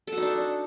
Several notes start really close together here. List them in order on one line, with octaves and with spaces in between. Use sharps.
A4 F#4 D#4 D4